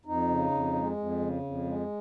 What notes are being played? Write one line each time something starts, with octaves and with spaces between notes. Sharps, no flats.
F2 D#4
C#3
F2
G#3
F2
C#3
F2
G#3